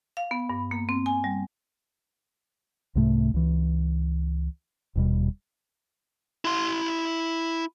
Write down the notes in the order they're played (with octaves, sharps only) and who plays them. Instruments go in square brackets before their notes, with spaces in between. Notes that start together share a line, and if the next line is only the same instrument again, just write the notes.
[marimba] F5
B3
G2
A#3
C4
G#5
G3
[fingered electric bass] C2 G#2 C3 A3
C#2 E3
D#1 D#2 B2 G3
[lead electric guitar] E4 C6